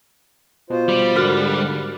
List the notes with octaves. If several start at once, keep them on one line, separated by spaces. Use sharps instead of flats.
B2 F4 C5
G3
G#2 D3 F#4 A#4 F6 F#6 A6